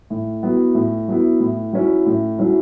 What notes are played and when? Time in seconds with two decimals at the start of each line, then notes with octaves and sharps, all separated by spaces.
0.10 A2
0.43 F#3 B3 E4
0.75 A2
1.08 F#3 B3 E4
1.40 A2
1.73 F#3 C#4 E4
2.06 A2
2.38 F#3 C#4 E4